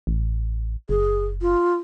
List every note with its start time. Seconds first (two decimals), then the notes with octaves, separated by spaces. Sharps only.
0.07 A1
0.89 F#1 G#4
1.41 F4